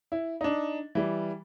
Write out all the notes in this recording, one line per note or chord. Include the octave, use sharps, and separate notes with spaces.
E4
D4 D#4
E3 G3